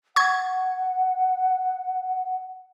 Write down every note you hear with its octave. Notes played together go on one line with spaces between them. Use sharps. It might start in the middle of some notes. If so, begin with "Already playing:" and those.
F#5 C#6 G#6